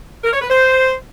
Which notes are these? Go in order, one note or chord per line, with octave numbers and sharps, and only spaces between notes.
A#4
C#5
B4
C5